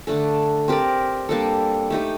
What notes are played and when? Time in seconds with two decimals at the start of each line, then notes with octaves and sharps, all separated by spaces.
0.07 D3 A3 D4 A4
0.68 C4 G4 A#4 D5
1.29 G3 A#3 D4 A4
1.90 A3 D#4 G4